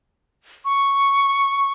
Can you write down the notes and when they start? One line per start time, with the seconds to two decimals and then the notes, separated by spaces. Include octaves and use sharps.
0.65 C#6